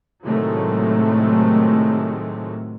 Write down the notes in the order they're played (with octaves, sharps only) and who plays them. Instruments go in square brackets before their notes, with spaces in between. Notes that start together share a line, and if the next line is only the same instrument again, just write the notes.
[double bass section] A2 C3 D#3 F#3 G#3 A3